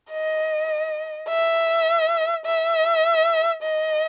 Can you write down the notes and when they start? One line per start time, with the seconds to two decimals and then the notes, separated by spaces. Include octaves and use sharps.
0.11 D#5
1.29 E5
2.46 E5
3.63 D#5